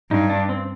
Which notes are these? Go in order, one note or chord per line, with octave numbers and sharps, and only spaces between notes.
G2 D#4
D4
C4